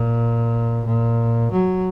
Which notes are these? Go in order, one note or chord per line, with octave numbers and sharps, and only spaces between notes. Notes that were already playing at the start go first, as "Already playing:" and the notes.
Already playing: A#2
A#2
F#3